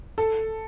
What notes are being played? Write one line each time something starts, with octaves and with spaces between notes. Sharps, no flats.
A4